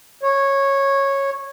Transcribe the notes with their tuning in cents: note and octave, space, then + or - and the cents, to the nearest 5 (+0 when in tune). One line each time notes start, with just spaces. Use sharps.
C#5 -10